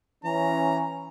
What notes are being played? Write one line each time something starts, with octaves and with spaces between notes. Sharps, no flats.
E3 C#4 A#5